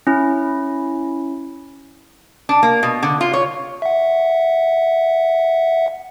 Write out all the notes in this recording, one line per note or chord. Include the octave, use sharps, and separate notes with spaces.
C#4 E4
D4
A#3
B2
D3
F4
C#5
E5 F#5